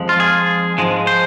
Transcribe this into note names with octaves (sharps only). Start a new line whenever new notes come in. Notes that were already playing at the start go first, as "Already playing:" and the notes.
Already playing: F2 F3 G#3
F4
G#4
G#2 F3 G#3
C5